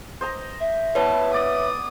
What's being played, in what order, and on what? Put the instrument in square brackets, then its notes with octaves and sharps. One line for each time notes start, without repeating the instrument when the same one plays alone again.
[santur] C5 D#5 A#5
[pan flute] E5
[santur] B3 E4 [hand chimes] B4 C#5 [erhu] A5
[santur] D5 [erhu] D#6